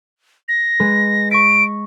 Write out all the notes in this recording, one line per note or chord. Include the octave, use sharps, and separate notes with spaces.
A#6
G#3 B4
C#6 A#6 B6 D7